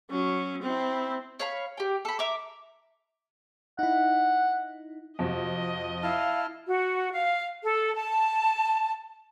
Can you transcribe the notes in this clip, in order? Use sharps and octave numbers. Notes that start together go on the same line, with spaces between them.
F#3 C#4
C4 E4
C#5 F5 B5
G4 G5
A4 B5
E5 A#5 D6
D#4 E4 F#5
F2 C3 F#4 D#5
E4 F5 A5 F6
F#4
F5
A4
A5